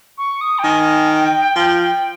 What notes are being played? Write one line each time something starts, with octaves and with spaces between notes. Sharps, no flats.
C#6
D#6
G5
D#3 G#5
G5
F3 G5
G5